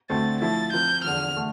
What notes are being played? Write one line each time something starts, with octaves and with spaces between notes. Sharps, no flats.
D2 D3 A3 C4 A6
F3 A3 E4 A6
F3 C4 F4 A#4 G6
E2 D3 F3 F6
D3 A3